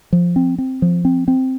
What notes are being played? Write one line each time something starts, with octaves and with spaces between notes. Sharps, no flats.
F3
C4
C4
F3
C4
C4